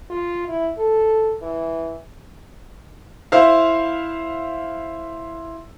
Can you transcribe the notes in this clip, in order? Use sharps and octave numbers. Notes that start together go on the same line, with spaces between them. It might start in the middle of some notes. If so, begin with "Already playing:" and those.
F4
E4
A4
E3
E4 C5 E5 F5